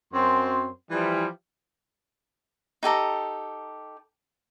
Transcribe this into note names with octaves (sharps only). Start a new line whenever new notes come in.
F#2 C4 C6
E3 F3 G3
D#4 G4 A4 A#5